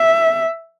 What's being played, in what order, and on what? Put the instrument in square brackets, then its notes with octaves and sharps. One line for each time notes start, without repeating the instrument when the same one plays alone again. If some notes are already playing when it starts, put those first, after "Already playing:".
Already playing: [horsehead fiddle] E5